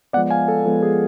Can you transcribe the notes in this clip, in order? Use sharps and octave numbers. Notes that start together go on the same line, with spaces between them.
F3 G#3 B3 D5 F#5
F5 G#5
A4
F3 G#3 B3 A4
G#4